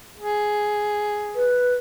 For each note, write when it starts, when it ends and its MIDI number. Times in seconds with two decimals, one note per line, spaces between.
0.17 1.61 68
1.35 1.75 71